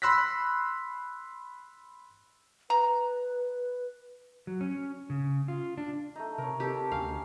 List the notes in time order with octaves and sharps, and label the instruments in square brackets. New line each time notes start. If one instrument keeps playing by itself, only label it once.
[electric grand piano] B5 C6 E6 F#6 A#6 B6
[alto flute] B4 [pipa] A#5
[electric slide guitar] F#3
C#4
C#3
F4
D4
[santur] A3 D#4
[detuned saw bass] C3 [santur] A#4 C#5
[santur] D#4 A4 A#4 [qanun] G4
[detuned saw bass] D2 [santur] C#4 [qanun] F5